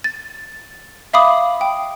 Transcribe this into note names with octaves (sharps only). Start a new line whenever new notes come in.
A6
E5 F5 B5 D6 D#6
G5